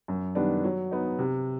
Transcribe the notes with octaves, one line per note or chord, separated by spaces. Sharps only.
F#2
D#3 G3 B3 D4
F#3
B3 D#4
C3